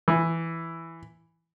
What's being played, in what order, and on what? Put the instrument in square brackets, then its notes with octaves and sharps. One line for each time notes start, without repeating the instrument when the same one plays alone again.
[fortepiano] E3